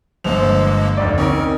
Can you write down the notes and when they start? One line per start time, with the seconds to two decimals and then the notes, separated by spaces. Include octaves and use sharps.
0.24 G1 F3 G#3 A#3 C5 F7
0.97 F1 D2 D5
1.18 C4 C#4 D#4 A#4